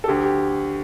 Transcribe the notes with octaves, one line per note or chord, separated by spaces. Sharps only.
A4
D2 G4
G4